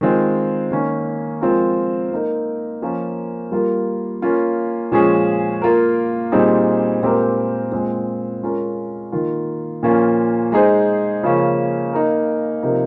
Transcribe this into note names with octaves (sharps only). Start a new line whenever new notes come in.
D#3 G#3 C4 F4
D#3 A#3 C#4
F3 G#3 C4 F4 A#4
A#3 D#4 A#4
F3 A#3 C#4 F4 A#4
G3 A#3 F4 A#4
A#3 C#4 F4
A#2 F3 G#3 C#4 G#4
A#3 F4 A#4
A#2 G3 C4 D#4 G#4
A#2 G#3 C4 G4 A#4
A#2 G#3 C4
G#3 C#4 F4 A#4
D#3 A#3 F4
A#2 F3 A#3 C#4 F4
G#3 D#4 G#4 C5
C#3 F3 A#3 C#4
A#3 D#4 A#4
C3 F3 A#3 D#4 A#4